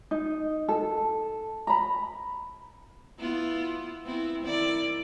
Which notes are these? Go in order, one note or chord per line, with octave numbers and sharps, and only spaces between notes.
D#4
A4
A#5 B5
B3 E4 F4
B3 C4 E4
D#3 E4 D5